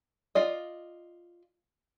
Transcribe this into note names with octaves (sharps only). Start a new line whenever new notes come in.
F4 D5 D#5